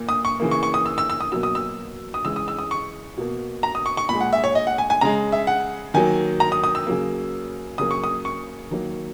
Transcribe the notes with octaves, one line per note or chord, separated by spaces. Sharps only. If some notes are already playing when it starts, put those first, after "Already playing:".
Already playing: A#2 A#3
D#6
C#6
C#3 E3 A#3
C#6
C#6
D#6
E6
E6
E6
D#6
B2 F#3 A#3 E6
D#6
E6
D#6
C#3 E3 G#3 E6
D#6
E6
D#6
C#6
B2 A#3
A#5
D#6
C#6
C#6
A#2 G#3 B5
F#5
E5
C#5
D#5
F#5
G#5
G#5
C#3 G#3 A#5
E5
F#5
D#3 F#3 A#3 G#5
A#5
D#6
D#6
E6
C#3 F#3 A#3
C#3 F#3 A#3 D#6
C#6
D#6
C#6
D#3 F#3 A#3